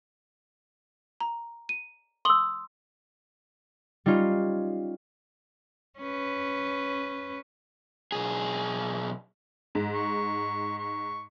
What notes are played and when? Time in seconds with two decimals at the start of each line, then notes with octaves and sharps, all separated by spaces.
1.20 A#5
1.69 D#7
2.25 C6 D#6 E6 F#7 G7
4.06 G3 C#4 D#4 F4
5.99 C#4 B4
8.12 B1 G#4
9.75 G#2
9.94 C#6
10.78 C#6